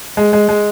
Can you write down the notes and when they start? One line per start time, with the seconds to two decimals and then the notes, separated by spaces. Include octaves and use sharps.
0.17 G#3
0.33 G#3
0.49 G#3